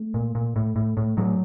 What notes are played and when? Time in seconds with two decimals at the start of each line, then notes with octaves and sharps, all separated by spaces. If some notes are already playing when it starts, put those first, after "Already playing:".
Already playing: A3
0.14 A#2
0.35 A#2
0.56 A2
0.76 A2
0.97 A2
1.17 A2 F#3